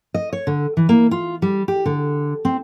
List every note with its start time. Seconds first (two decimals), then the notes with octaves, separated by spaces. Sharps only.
0.14 D#5
0.33 C#5
0.47 D3
0.77 E3
0.89 A#3
1.11 F4
1.42 G3
1.68 G4
1.85 D3
2.45 C4